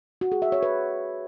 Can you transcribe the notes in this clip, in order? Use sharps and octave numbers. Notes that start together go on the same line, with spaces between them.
F#4
G#4
E5
C#5
B4